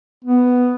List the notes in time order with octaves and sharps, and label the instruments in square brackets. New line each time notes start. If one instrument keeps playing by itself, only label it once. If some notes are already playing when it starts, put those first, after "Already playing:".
[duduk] B3